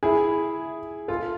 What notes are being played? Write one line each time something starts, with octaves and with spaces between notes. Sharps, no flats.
E4 G#4
F4 A4